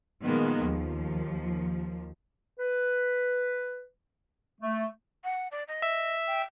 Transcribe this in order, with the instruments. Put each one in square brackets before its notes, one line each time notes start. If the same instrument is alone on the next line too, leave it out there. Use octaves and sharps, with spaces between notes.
[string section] A#2 D#3 F3 G#3 A#3 B3
D#2 F3
[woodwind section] B4
A3
[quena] F#5
D5
D#5
[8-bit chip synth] E5
[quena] G5